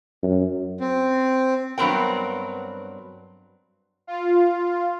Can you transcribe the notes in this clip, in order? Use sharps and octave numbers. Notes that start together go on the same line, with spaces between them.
F#2
C4
G2 F#3 B3 C4 A#4 G5
F4